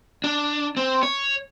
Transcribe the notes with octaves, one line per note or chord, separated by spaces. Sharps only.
D4
C4
C#5